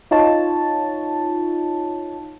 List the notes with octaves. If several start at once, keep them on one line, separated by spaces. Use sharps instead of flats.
D#4 F4 C#5 A5